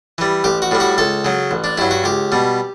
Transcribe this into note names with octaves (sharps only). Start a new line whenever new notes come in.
E3 G3
A1 G4
F#4
A2 G3
F#4
C#2 A4
C#3 F#3
A1
D4
G2 F#3 E4
F#4
C#2 G4
B2 G3